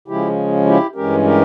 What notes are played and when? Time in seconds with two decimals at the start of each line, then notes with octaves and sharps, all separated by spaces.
0.08 C#3 F3 G#3 C#4 E4 G4
0.66 E4 G4
0.95 G2 E3 G#3 C#4 G4 A#4
1.25 G4 A#4